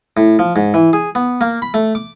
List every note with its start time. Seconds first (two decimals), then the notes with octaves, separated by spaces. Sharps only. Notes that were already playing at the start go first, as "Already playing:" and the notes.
0.17 A2
0.39 F3
0.56 G#2
0.74 E3
0.93 G#4
1.15 B3
1.41 A#3
1.62 B5
1.74 A3
1.95 D6